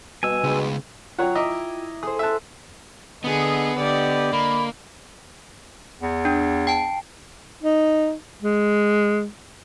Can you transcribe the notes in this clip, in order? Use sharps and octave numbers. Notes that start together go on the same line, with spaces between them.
B2 G3 G#5 E6
C#2 B3 G#4
F#3 F4 C#5 F#5 G5
E4 D#5 E5 A#5 D6
G#6
G#4 A4 C5 D#6
E5 A5 C6 E6 F#6
D3 B3 G#4 D#5
D3 G4 D5 D#5
A#3 B5
E2
D4
G5 A5
D#4
G#3